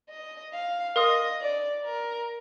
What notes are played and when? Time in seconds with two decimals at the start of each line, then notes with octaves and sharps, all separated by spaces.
0.09 D#5
0.53 F5
0.96 A#4 D#5 F5 C6 D#6
1.40 D5
1.84 A#4